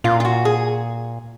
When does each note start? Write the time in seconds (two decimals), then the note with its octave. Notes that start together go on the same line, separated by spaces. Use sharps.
0.04 A#2 F4
0.20 F4
0.25 F#4
0.45 G#4